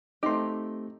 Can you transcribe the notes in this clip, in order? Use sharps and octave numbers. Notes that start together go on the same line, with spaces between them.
A3 C4 D#4 G4 C6 D6